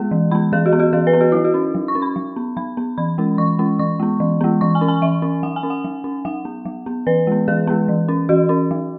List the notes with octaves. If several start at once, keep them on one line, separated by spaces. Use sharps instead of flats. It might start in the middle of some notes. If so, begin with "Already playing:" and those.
Already playing: G#3 B3 G#4
E3
G#3 B3 B5
E3 G#4
F#4
B3
F#4
E3 G#4
B4
B3
F#4
F#3 E4
F#4
C#4
F#3
C#6
C#4
B5
F#3
B3
F#3 B5
B3
E3 B5
G#3 C#4
E3 C#6
G#3 C#4
E3 C#6
G#3 B3
E3
G#3 B3
E3 C#6
G#5
C#4
G#5
E3 E5
C#4
F#3 F#5
G#5
C#4
F#5
F#3
C#4
F#3 F#5
B3
F#3
B3
E3 B4
G#3 B3
E3 G#4
G#3 B3
E3
C#4
E3 F#4
C#4
F#3